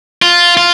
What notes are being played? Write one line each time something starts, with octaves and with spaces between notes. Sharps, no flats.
F4
F4